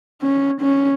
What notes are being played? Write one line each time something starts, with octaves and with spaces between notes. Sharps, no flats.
C#4
C#4